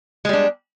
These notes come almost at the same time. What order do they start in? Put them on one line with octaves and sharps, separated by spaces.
G#3 G3 D4